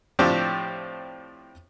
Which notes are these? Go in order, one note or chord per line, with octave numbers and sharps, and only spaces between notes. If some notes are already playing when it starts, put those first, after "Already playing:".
A2 F3 C4 D4 G4